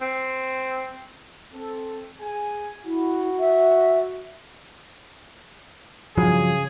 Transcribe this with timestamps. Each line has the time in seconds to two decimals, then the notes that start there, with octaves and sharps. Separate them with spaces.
0.02 C4
1.54 C4 A4
2.20 G#4 G#5
2.86 E4 F#4
3.40 E5
6.17 G2 C#3 F3 F#3 G#4